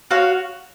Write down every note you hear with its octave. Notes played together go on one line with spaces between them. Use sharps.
F#4 C#5 F5